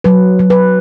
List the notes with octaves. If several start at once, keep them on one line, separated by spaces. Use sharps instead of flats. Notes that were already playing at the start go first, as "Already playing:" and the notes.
F#3 B4
F#3
B4